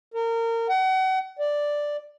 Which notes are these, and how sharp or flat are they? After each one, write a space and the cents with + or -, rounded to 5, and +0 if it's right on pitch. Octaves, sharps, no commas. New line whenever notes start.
A#4 -25
F#5 +35
D5 +0